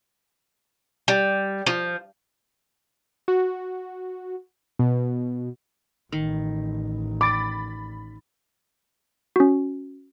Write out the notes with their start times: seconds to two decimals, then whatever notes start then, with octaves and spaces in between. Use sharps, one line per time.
1.08 G3
1.66 F3
3.28 F#4
4.79 B2
6.12 A1 D#3
7.21 B5 D6 A6
9.36 C#4 F#4